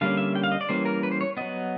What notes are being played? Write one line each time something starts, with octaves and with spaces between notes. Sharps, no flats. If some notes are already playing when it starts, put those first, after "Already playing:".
D3 G3 A#3 C#4 F5
E5
G5
F5
D#5
D5
E3 G3 A#3 C#4 C5
A#4
B4
C5
C#5
F#3 B3 D#5